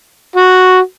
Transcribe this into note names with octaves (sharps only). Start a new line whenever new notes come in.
F#4